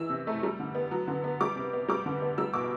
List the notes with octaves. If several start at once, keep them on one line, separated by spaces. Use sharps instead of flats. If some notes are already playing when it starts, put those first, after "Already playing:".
Already playing: E3 E6
C3
A3
G3
D3
B3
F#3
D3
B3
G3 D6
C3
B3
G3 D6
D3
B3
G3 E6
B2 D6